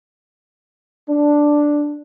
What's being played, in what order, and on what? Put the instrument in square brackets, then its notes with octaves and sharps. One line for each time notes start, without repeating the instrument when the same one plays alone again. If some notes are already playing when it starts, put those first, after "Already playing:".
[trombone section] D4